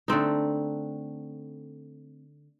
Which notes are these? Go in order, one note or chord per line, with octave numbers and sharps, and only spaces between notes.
D3 A3 C4 D#4